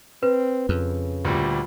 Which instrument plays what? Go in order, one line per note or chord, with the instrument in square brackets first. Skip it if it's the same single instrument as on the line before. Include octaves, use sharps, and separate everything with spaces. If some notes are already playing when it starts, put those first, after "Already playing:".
[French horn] C4 [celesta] B4
[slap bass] F2 [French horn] C#3
[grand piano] D2 A#2 G3